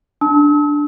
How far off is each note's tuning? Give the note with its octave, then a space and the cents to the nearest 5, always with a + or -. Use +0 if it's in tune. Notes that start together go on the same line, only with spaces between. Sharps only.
D4 +0 A5 -15 E6 -45